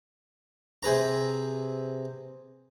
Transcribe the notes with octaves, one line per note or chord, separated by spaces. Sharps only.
C3 G#4 B4 A#5